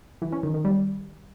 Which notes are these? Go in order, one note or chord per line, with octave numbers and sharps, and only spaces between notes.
E3
C#4
D#3
D#3
G3